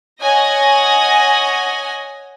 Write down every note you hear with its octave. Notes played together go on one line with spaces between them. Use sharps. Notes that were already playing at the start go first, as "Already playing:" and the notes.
C#5 D#5 F#5 G#5 A#6